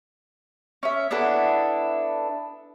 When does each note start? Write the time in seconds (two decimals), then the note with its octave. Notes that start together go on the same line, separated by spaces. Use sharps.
0.83 C#4 E5
1.11 B3 D4 E4 A4